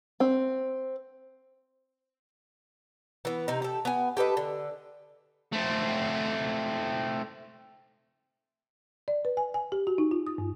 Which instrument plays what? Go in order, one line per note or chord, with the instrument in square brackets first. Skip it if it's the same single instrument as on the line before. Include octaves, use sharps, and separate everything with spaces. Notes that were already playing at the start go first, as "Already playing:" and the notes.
[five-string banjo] C4
[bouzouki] E3 B3
C3 D#4
G4 A4
B3 G#5
G4 A4 B4 D#5
D3
[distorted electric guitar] A3 C4
[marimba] D5
B4
G#5
G#5
G4
F#4
D#4
F4
D#6
G2